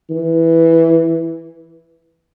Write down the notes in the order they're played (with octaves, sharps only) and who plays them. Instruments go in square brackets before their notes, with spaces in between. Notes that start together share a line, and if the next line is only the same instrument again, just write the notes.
[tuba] E3